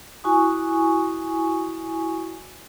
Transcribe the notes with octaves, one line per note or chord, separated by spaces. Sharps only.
E4 F#4 G#5 C#6 D#6